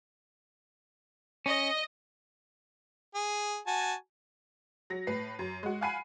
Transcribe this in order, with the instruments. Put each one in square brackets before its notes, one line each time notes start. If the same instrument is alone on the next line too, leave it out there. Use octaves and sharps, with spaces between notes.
[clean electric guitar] C#4 [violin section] D#5
[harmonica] G#4
F#4 G#5 A5
[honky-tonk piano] F#3 A#6
A2 B4 C7
F#2
G#3 F#4
F5 F#5 G#5 B5 C7 D#7